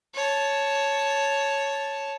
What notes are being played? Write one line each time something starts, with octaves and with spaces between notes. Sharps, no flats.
C#5 A5